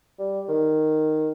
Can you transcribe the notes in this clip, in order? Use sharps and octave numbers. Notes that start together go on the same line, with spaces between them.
G3
D#3